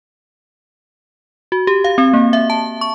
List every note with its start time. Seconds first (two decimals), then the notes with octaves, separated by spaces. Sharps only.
1.52 F#4
1.67 G4
1.84 F5
1.98 C4
2.14 A#3
2.33 E5
2.50 A5
2.81 C#6